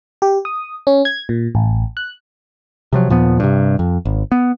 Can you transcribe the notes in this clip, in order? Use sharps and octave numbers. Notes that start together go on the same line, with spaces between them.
G4
D#6
C#4
G#6
A#2
A1
F#6
C3 F3 F#3
D#2 A#2 F3 B3
G2 C3
F2
G#1
B3